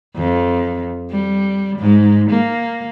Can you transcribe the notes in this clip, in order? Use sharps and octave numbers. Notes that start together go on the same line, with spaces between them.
F2
G3
G#2
A#3